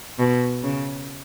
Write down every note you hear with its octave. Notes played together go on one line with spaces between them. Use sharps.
B2
C#3